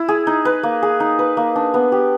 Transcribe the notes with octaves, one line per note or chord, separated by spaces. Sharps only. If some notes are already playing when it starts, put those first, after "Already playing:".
Already playing: E4
G#4
D#4
B4
A#3
G#4
D#4
B4
A#3
D4
B3
G4